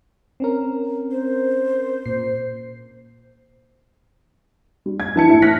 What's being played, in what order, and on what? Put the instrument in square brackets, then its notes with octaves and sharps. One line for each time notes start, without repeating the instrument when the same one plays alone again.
[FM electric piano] C4 C#4 A#4
[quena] C5
[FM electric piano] A#2 C7
[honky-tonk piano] G3
G#6
E3 A5 C#7
A2 E4
A5 F6 F#6 A#6 B6